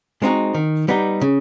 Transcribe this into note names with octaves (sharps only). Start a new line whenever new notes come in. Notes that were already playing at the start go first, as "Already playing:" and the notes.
G#3 C4 D#4 F#4
D#3
G3 B3 D#4 G4
C#3